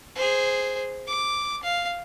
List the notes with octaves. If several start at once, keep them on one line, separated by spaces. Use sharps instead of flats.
G#4 C5
D6
F5